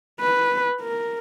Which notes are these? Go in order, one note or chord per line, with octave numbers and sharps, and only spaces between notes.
B4
A#4